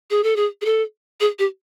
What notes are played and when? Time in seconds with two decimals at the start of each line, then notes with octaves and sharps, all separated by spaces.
0.10 G#4
0.23 A4
0.36 G#4
0.61 G#4
0.65 A4
1.20 G#4
1.39 G4